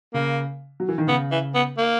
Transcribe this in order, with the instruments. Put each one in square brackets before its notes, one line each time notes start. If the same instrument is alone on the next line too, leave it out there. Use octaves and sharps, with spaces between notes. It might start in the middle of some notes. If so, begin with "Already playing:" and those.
[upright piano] C#3 [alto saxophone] A#3
[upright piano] F#3
E3
D#3
[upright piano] C#3 [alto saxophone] B3
[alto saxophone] E3
B3
A#3